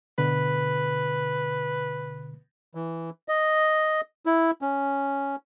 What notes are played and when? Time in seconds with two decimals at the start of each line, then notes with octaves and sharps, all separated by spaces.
0.18 B2 D3 B4
2.75 E3
3.28 D#5
4.26 E4
4.62 C#4